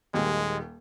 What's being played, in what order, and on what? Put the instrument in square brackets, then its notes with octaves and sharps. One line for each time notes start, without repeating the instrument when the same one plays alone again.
[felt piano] D#1 D#2 [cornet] G#3